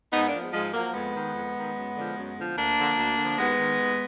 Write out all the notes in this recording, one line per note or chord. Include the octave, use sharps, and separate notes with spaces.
G#2 B3 D#4
A#3 D4
F3
G#3 B3
G#2 F3 G#3
F3 F#3 A#3
F2 G#3 B3
D#3
F2
D#3
F#2
D3 F3
F#2
D3 F3
D2 A#3 D4
D3 F3
D2
D3 F3
D#2 G#3 B3
D#3
D#2